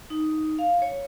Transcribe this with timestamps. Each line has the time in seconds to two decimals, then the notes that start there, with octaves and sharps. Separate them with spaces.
0.10 D#4
0.59 F5
0.82 C#5